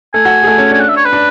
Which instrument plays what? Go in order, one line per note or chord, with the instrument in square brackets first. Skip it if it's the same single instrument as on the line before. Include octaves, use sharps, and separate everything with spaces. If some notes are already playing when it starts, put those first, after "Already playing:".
[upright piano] A3 A4 [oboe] G#5
[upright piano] F#4 F#5
G#4
A3 A4
C#4 C#5
[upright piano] D4 [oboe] G#5
[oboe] F#5
E5
C#5
B4
[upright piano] D4